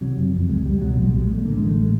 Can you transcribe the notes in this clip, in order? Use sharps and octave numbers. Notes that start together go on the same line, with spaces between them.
C3 F#3
F#1
F2
C#2 G#3
C#2 G3
B2 F#3
A#1 G#3
A#1 G3
G#3
A#2 A3
D3 A#3
A1 G#3
A3
G#3